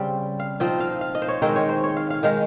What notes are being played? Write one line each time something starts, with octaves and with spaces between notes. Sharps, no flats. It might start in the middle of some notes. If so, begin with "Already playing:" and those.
Already playing: C#3 G3 C4
F5
F3 C4 D#4 D#5
F5
F5
D#5
C5
C#5
D#3 G#3 C4 D#4 D#5
C#5
C5
C#5
F5
F5
D#3 G#3 D#4 F5